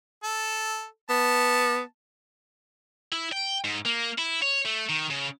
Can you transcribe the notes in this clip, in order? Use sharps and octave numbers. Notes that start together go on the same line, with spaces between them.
A4
B3 A5
E4
G5
G#2
A#3
E4
C#5
A3
D#3
C#3